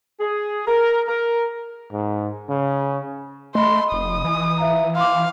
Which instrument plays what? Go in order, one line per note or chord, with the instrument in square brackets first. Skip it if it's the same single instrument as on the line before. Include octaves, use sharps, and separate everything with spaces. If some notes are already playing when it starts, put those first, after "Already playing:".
[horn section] G#4
A#4
A#4
[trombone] G#2
C#3
[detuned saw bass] A3 [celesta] D#5 B5 [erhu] C6
[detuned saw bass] F1 [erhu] D#6
[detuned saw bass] E3
[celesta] E5 F5 A#5
[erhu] F5 [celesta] C6 D6